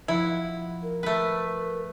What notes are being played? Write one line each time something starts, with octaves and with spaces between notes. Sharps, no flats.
F3 E4 F#5
A#4
A3 B4